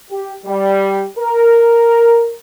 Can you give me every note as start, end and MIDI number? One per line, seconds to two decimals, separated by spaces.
0.11 0.34 67
0.46 1.03 55
1.18 2.35 70